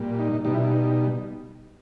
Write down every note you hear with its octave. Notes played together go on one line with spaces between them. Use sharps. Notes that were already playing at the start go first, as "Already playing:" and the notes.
Already playing: A#2 G3
D#4
B2 G3 D#4
E4
D#4